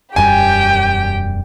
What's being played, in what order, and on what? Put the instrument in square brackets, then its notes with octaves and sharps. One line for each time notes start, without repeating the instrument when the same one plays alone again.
[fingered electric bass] E1 F#2 G3 [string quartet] G4 G5 [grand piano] G#5